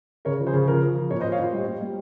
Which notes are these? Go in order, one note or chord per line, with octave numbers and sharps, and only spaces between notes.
C#3 A#4 C#5
F3
G#4 C5
C#3
F3 A#4
F3
F3
A#2 A#4 C#5
C5 D#5
A#2
C#5 F5
A#2 C5 D#5
G3
G3
G3